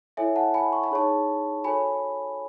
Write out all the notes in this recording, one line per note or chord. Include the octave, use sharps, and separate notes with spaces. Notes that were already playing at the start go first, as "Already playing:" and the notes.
E4 A4 C#5 E5 G#5
F#5 A5
G#5 B5
C#6
B5
D#4 G#4 C#5 A5 C#6
F#4 A4 C#5 G#5 B5